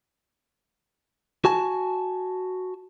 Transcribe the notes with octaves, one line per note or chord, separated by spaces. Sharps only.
F#4 G#5 A5